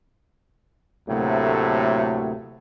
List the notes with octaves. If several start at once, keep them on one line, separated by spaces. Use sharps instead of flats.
D2 A2 C3 F#3 A3 A#3